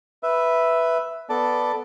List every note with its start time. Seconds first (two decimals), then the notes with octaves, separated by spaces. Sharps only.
0.23 B4 E5
1.29 B3 A4 D5 A5